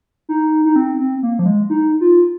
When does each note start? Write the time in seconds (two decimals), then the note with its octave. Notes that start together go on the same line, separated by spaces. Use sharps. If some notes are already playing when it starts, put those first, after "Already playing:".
0.29 D#4
0.65 D#4
0.76 C4
0.99 C4
1.23 A#3
1.39 F3
1.46 G#3
1.70 D#4
2.01 F4